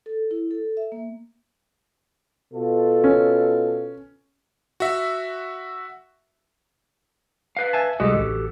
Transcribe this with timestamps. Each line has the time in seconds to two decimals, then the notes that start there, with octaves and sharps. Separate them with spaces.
0.06 A4
0.31 E4
0.51 A4
0.77 E5
0.92 A#3
2.54 B2 F4 A4
3.04 C#4
4.80 F#4 E5
7.57 B4 F5
7.73 E5 G#5 A5
8.00 C2 G#3 F#4 G4 A4 D#5
8.14 A1